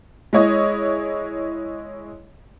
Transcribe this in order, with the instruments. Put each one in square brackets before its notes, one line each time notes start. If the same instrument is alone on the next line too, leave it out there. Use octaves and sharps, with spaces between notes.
[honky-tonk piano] G#3 E4 C#5 D#5